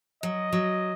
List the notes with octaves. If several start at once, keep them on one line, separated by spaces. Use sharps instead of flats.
F#3 D#5
F#3